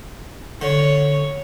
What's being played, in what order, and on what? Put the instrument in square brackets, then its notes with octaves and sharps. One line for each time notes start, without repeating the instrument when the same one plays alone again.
[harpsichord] D3 [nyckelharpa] C#5